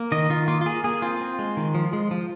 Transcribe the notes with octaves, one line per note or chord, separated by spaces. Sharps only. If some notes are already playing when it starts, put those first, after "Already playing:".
Already playing: A#3
D#3 D#5
D#3 F4
A#3 F4
F4
A#3 G#4
A#3 G#4
C4 F4
C4
G#3
D#3
F3
G#3
F3